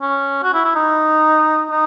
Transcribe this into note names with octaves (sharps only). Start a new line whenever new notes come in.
C#4
F#4
E4
E4
D#4
D#4